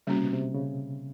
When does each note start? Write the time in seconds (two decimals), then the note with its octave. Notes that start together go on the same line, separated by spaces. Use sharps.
0.07 C#3 G3 A#3 C#4 F#4
0.16 C3
0.24 B2
0.33 C3
0.55 C#3